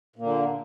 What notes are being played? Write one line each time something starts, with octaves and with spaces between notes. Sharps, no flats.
A#2 D3 A#3